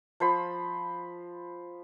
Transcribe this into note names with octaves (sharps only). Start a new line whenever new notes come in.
F3 C5 B5